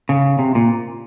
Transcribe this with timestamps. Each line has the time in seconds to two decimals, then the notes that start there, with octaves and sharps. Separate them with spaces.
0.09 C#3
0.39 C3
0.55 A#2